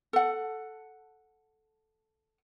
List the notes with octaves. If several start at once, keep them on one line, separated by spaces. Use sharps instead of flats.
A4 F#5